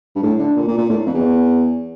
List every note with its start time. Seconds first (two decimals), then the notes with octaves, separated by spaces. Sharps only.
0.16 G2
0.23 A2
0.39 D3
0.56 A#2
0.67 A#2
0.78 A#2
0.89 A2
1.06 F2
1.14 E2